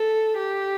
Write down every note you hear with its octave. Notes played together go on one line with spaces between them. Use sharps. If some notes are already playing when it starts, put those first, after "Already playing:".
Already playing: A4
G4